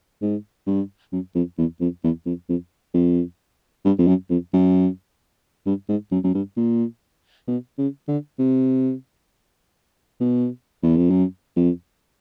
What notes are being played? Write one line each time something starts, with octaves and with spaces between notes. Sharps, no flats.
G#2
G2
F#2
F2
E2
F2
E2
F2
F2
F2
G2
F2
F#2
F2
F#2
G2
G#2
F#2
F#2
G2
A#2
B2
C#3
D3
C3
B2
E2
F2
F#2
F2